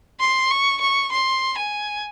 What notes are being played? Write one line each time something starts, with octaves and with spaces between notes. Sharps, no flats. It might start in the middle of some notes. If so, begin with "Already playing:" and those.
C6
C#6
C#6
C6
G#5